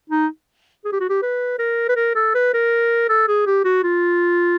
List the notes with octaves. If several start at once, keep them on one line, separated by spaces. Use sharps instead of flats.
D#4
G#4
G4
F#4
G4
B4
A#4
B4
A#4
A4
B4
A#4
A4
G#4
G4
F#4
F4